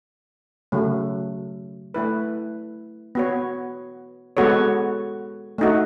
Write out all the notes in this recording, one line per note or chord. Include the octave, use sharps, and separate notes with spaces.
C#3 F#3 A3
A3 E4 B4
B3 F#4 C#5
G#3 B3 F#4 A4 C#5
A3 D#4 F#4